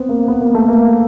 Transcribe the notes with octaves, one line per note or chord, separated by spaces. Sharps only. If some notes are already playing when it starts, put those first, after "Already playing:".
Already playing: B3 C4
A#3
B3
A#3
A3
A#3